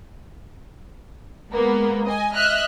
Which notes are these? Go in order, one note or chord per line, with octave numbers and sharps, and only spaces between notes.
G#3 A#3 B3
D#5 G#5
D#5 E5 F6 F#6